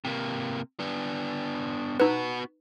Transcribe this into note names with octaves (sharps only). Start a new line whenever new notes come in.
C3 A#3
B3 D4
B3 D#4 F#4 B4